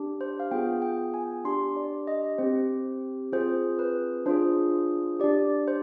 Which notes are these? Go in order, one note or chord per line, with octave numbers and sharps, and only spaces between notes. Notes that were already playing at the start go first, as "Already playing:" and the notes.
Already playing: D4 G4
C5
F5
B3 F4 G#4 G5
G5
G#5
D4 G4 C6
D5
D#5
C4 G4 C5
C4 F4 G#4 C5
B4
D4 F4 G#4 C5
D4 G4 D5
C5